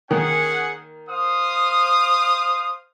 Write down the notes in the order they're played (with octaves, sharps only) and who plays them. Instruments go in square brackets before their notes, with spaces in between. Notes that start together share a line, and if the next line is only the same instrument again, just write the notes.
[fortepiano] D#3 A#3 [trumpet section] C#4 G#4 F#5
[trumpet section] C5 F5 D#6